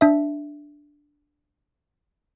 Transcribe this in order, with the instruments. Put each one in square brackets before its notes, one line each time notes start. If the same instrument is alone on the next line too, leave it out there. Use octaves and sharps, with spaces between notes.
[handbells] D4 E5